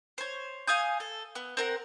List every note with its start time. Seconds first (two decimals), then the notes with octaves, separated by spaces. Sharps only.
0.18 C5 C#5
0.67 F5 G#5 D#6 G6
1.00 A4
1.35 B3
1.57 C4 A#4 F#5